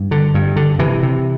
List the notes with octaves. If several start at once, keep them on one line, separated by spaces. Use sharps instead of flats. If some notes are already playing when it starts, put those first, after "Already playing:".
Already playing: G2
D3
G2
D3
C3 E3
C3